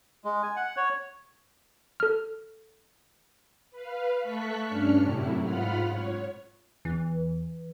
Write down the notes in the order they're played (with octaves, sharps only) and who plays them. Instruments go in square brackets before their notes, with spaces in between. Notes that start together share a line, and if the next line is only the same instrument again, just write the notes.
[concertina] G#3
G#5
F#5
C#5
[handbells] A4 F6
[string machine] B4 F5
A3 A4 C#6 F#6 B6
G2 C#4 D4 F6 C#7
F#2 A2 C3 E4
G#2 F4 F#5 B5 F6
C#5
[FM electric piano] E2 [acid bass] E3